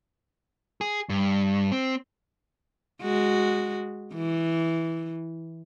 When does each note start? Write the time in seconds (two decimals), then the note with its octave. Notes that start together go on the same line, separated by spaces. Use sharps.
0.81 G#4
1.09 G2
1.72 C4
3.02 G#3 F#4
4.14 E3